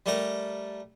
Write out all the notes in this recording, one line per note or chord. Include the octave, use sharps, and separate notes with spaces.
G3 A3 A#4